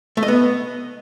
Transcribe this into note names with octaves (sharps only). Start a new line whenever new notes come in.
A3
D#5
B3